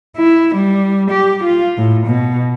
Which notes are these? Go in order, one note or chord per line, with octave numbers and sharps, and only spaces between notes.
E4
G3
G4
F4
A2
B2